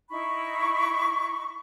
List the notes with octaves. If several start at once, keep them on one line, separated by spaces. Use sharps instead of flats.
D#4 E4 B5 C#6